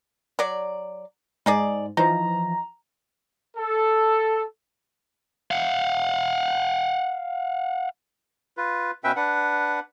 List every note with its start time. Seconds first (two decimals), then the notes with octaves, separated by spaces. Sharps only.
0.39 F#3 D5
1.46 G#2 D#4 G#4 D5
1.97 E3 F3 D#4 A#5
3.57 A4
5.51 F5 F#5
8.57 F4 B4
9.04 B2 C#4 B4 E5 G5
9.16 D4 B4 F#5